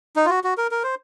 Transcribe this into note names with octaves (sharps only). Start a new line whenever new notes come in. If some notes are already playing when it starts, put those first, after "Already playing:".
D#4
F4
F#4
F#4
A#4
A#4
C5